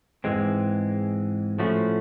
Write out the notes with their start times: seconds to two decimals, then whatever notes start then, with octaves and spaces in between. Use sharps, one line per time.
0.24 G#2 E3 G#3 C4
1.59 A2 F3 A3 C#4 F#4